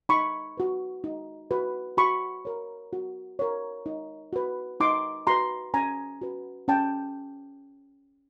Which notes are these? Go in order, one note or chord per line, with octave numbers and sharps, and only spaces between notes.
D#4 B5 C#6
F#4 B4
D#4
F#4 B4
F#4 B5 C#6
A#4 C#5
F#4
A#4 C#5
D#4
F#4 B4
D#4 C6 D6
F#4 B4 A#5 C6
C#4 G#5 A#5
F#4 B4
C#4 G5 A5